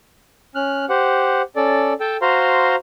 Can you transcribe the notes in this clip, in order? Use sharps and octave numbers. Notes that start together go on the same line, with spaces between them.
C#4 F6 F#6
G4 C5 F#5
C#4 A4 D5
A4 G5 A5
F#4 C5 F5 A#5 C6